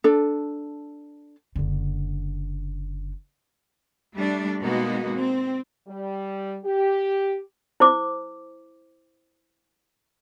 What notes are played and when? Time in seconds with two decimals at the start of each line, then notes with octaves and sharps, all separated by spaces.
0.04 D4 A4
1.55 F#1 D3
4.17 G3 A3 D4
4.61 B2 G#3 A#3 B3 D#4 F#4
5.16 C4
5.87 G3
6.64 G4
7.80 E4 C5 D6